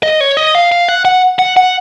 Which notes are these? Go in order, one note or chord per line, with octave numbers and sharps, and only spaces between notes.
D#5
C#5
D#5
F5
F5
F#5
F#5
F#5
F#5